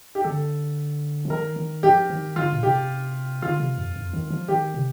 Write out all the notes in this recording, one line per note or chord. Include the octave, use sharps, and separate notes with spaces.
G4
D3 A4
F3
D#3 A#4
D#3
F3 G4
D#3
D3 F4
A#2
C3 G4
D3 F4
C3
F2
F2
D#3
F3
D#3 G4
C3